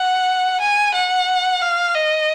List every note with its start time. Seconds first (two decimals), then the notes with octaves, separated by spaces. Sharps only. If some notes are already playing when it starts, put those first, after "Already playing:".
Already playing: F#5
0.61 G#5
0.94 F#5
1.62 F5
1.96 D#5